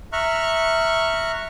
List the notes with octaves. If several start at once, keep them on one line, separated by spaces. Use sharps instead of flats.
E5 A#5 C#6 F6 F#6